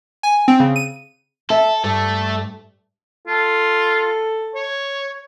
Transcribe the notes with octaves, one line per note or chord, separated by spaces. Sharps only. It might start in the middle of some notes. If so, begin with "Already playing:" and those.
G#5
C4
C#3
D#7
A4 E5
G2 A3 A4
F4 A4
C#5